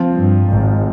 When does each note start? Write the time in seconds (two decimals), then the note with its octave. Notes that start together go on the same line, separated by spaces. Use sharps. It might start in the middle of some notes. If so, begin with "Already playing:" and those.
Already playing: F3 C4 F4
0.13 G2
0.48 G#1 G#2